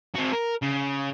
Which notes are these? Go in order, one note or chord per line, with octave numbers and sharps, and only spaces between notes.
C4 F#4
A#4
C#3